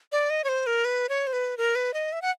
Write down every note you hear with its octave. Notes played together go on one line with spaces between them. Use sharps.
D5
D#5
C#5
C5
A#4
B4
C#5
C5
B4
A#4
B4
D#5
E5
F#5